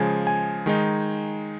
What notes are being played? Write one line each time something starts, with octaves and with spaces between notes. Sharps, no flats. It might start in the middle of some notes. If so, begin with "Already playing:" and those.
Already playing: C#3 F3 G#3 G#5
G#5
D#3 G#3 D#4